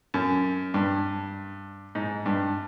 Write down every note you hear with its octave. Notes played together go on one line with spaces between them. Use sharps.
F#2
G2
G#2
G2